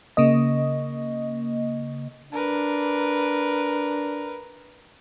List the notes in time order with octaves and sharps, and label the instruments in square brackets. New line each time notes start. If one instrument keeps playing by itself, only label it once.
[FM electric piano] C#3 A#3 D#5
[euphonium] D4 [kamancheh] A#4 B4